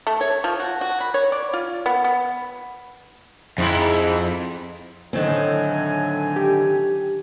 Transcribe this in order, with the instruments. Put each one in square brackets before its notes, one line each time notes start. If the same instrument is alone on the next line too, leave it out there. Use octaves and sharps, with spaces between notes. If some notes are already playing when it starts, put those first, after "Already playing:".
[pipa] A3
C#5
F3
F#4
F#4
B5
C#5
D5
F4
B3
B3
[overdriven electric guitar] F2 [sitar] G#2 E4
[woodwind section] A2 F#3 G#5 [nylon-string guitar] D3 D#3 C4
[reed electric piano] G4